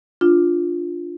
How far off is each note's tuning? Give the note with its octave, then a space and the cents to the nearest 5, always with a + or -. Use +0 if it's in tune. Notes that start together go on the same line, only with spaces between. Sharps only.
D4 +0 F4 +0